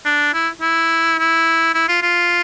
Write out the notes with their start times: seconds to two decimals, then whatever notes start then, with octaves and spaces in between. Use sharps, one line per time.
0.05 D4
0.34 E4
0.62 E4
1.19 E4
1.74 E4
1.89 F4
2.02 F4